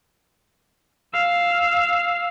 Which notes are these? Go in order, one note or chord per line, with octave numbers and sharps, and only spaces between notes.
F5 E6